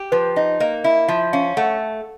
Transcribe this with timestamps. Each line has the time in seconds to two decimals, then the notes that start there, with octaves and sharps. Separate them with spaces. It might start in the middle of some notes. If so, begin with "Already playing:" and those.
Already playing: G4
0.12 F3 B4
0.36 D#4 D#5
0.60 A#3 D#5
0.84 E4 E5
1.08 F3 E5
1.33 C#4 F5
1.57 A3 F#5